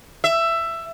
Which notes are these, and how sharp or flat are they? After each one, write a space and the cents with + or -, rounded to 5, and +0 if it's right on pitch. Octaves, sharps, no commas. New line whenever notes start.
E5 +15